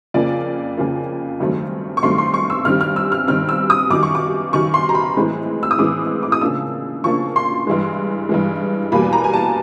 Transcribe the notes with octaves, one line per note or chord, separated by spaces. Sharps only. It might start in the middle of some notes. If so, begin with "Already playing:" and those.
F2 C#3 F3 A#3 D5
F2 C#3 F3 A#3
G2 D#3 F#3 A3 C4
C#6
G2 D#3 F#3 A3 C4 C6
C6
C#6
E6
G2 D#3 G3 C4 F6
F6
E6
F6
G2 D#3 G3 C4 F6
E6
D#6
F#2 D#3 G3 D6
C#6
D6
F#2 D#3 G3 C#6
C6
A#5
B5
A2 E3 G#3 C4
E6
D#6
A2 E3 G#3 C4 D6
D6
D#6
C#3 F3 A#3 D4 E6
C#3 F3 A#3 D4 C#6
C6
G2 E3 G#3
G2 E3 G#3
E2 B2 G3 A#3 B5
A#5
G#5
A5